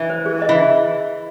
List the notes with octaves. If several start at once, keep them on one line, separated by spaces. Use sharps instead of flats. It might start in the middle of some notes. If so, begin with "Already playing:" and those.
Already playing: E3
C5
G#4
D#5
E3